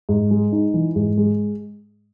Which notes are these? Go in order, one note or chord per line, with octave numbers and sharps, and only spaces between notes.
G#2
G#3
D#4
E3
G#2
G#3